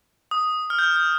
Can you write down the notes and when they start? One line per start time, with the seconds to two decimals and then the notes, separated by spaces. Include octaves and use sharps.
0.31 D#6
0.70 F6
0.79 G6
0.83 F6
0.96 G6